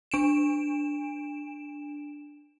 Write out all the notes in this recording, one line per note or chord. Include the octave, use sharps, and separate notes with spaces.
D4 D7 E7